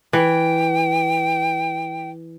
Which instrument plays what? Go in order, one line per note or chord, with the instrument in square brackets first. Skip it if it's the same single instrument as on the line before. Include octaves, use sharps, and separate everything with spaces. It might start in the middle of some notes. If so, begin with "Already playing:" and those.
[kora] E3 [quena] G5